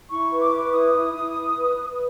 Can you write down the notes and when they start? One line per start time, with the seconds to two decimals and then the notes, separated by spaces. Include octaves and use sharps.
0.10 E4 C#6
0.31 B4
0.41 D6
0.52 B4
0.72 E4 D#6
0.93 E4
1.14 E4
1.35 B4
1.55 B4
1.76 B4